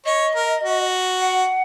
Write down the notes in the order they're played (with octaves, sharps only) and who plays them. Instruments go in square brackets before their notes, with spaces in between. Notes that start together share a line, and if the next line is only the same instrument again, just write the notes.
[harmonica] C#5 [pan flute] D#5
[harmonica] A#4
F#4
[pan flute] F#5